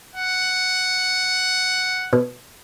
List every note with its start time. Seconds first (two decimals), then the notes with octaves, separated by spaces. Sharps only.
0.16 F#5
2.13 B2